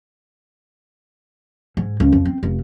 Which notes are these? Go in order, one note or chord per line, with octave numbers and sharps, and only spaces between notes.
G#2
C#2
F2
C4
F1